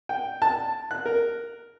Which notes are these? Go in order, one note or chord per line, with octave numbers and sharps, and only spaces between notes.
G5
A5
F#6
A#4